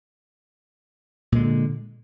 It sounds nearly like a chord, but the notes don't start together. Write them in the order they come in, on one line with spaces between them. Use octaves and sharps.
A#2 G#3 D3